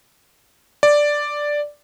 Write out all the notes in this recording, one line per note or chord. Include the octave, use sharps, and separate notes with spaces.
D5